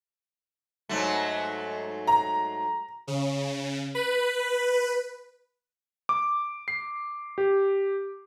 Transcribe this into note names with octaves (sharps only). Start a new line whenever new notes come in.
G#2 F#3 A3
A#5
C#3
B4
D6
C7
G4